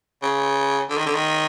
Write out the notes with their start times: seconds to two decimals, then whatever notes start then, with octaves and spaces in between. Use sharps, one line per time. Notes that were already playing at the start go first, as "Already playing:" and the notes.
0.22 C#3
0.90 D3
0.97 D#3
1.06 D3
1.14 D#3